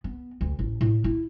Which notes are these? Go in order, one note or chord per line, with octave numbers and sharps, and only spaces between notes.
B3
D2
A1
A2
E4